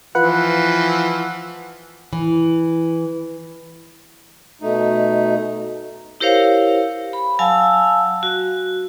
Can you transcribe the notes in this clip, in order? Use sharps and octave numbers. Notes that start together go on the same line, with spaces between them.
E3 F3 F4 B4 F#5
E3
B2 A3 D#4
E4 G4 A#4 C5 C#5 F5
B5
F#3 F5 G#5 A5 E6
F#4